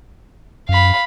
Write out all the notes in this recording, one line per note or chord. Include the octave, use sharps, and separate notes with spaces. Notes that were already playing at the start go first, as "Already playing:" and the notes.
F#2 F5 B5